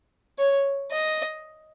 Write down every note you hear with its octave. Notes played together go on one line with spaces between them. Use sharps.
C#5
D#5